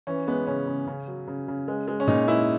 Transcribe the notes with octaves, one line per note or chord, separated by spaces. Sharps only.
E3 C#4
G#3 B3
C#3 C#4
C#3
C#3
F#3
C#3
C#3
G#3
G#3
C#4
A#2 D#4
G#3 E4